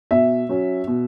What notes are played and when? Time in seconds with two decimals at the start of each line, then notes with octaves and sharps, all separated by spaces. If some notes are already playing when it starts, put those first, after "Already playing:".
0.11 B2 E5
0.49 F#3 C#4
0.87 B2